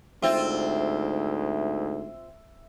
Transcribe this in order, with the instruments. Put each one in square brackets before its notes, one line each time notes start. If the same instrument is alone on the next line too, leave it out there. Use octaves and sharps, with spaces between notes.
[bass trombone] D2 [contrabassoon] G#2 [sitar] C4 F4 [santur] E5